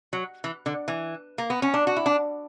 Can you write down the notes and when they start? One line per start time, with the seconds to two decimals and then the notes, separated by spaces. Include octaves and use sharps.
0.13 F#3
0.44 E3
0.66 D3
0.88 E3
1.38 A#3
1.50 B3
1.62 C#4
1.74 D4
1.87 F#4
1.96 E4
2.06 D4